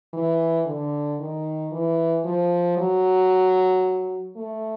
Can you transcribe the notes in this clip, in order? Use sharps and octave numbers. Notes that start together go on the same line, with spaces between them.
E3
D3
D#3
E3
F3
F#3
A3